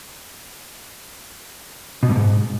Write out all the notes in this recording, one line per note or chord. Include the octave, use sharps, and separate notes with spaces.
B2
G2
G#2